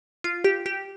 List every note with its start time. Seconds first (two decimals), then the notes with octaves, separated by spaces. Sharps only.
0.24 F4
0.44 G4
0.66 G4